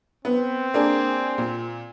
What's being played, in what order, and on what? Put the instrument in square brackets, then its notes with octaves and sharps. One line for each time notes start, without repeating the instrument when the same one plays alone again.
[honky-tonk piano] B3 [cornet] C4
[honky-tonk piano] A#3 D4 G#4
A#2